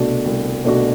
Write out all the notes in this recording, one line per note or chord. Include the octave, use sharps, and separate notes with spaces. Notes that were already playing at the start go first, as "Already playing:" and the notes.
Already playing: C2 B2 A3 D4 F#4
C2
B2 A3 D4 F#4